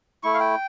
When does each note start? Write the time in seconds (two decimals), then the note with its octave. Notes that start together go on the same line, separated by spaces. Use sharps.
0.23 A3 E4 C#6
0.34 F5
0.40 G5